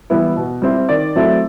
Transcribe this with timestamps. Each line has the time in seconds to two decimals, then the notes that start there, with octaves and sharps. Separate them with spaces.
0.10 E3 G3 B3 E4
0.36 B2
0.62 G3 C4 E4
0.89 D#3 D5
1.16 F#3 A3 C4 E4